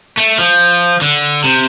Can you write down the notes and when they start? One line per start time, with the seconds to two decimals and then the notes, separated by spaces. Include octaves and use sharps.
0.17 A3
0.39 F3
1.02 D3
1.44 C3